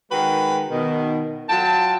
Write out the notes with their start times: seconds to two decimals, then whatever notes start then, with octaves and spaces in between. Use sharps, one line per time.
0.11 D#3 G#3 F#4 B4 G5 B5
0.70 B2 D#3
1.49 F#3 F4 G5 A5